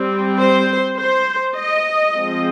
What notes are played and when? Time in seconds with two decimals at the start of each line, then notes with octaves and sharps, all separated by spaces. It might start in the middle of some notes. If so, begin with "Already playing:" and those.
Already playing: G3 C4
0.40 C5
0.99 C5
1.56 D#5
2.14 F3 G#3 C4